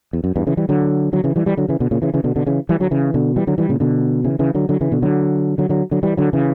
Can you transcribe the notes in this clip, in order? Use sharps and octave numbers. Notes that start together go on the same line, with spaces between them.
E2
F#2
E2 G2
C#3 E3
E3 G3
D3 F#3
D3 F#3
C#3 E3
E3 G3
E3 G3
D3 F#3
C#3 E3
B2 D3
A#2 C#3
C#3 E3
C#3 E3
B2 D3
B2 D3
C#3 E3
E3 G3
D3 F#3
C#3 E3
B2 D3
E3 G3
D3 F#3
E3 G3
A#2 C#3
B2 D3
C#3 E3
C#3 E3
D3 F#3
D3 F#3
C#3 E3
B2 D3
D3 F#3
D3 F#3
D3 F#3
D3 F#3
E3 G3
D3 F#3
C#3 E3